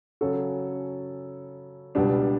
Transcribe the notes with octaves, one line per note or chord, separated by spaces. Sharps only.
C#3 F#3 C#4 F#4 A4
C#2 B2 G3 D4